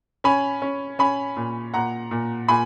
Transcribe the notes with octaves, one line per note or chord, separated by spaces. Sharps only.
C#4 G#5 B5
C#4
C#4 G#5 B5
A#2
A#2 F#5 A#5
A#2
A#2 G#5 B5